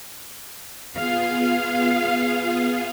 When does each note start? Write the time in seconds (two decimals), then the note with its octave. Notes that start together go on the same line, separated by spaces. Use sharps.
0.95 B3 F4 G#4 F5